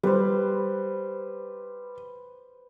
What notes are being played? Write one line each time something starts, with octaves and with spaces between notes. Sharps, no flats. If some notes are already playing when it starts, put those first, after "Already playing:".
G3 B4 C5